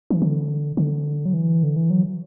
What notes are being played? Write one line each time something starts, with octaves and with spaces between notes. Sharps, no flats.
E3
D3
D3
F#3
E3
D3
E3
F#3